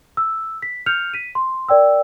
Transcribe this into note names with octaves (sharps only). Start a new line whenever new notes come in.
E6
B6
F6 G6 C#7 F7
B6 D#7
C6
A#4 D5 G5 E6